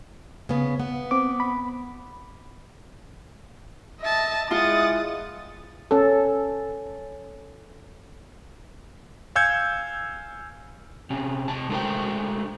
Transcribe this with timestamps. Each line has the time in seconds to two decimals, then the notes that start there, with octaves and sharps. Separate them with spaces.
0.49 C#3 B3
0.80 B3
1.11 C4 D6
1.40 B5
4.01 D#5 E5 A5
4.51 G#3 E4 F4 F#5 D#6 A6
5.91 C#4 A4
9.35 F5 G#5 E6 G6 G#6 C#7
11.10 C3 C#4
11.48 C3 A5
11.69 G#3 A3 D4 A#4 C5 G5